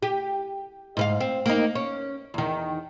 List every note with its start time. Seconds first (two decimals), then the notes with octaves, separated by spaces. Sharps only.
0.03 G4
0.97 G#2 B4 F5
1.20 C4
1.46 A#3 D#4
1.75 C#4
2.34 E2 D#3